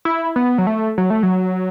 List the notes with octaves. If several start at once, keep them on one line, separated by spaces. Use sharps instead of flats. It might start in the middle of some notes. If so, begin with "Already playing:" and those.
E4
B3
F#3
A3
F#3
A3
F#3